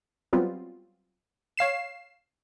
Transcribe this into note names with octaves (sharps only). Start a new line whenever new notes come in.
F#3 G3 B3 C4 F4
C#5 F5 C7 E7